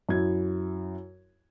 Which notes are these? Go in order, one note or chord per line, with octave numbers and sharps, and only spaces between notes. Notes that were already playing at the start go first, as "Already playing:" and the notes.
F#2 E4 G#6